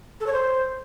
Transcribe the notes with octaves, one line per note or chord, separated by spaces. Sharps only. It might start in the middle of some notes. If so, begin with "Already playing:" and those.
A4
C#5
C5